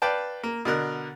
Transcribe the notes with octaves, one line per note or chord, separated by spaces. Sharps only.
B4 D5 F5 G5 A5
A#3
B2 D3 A#4 F#6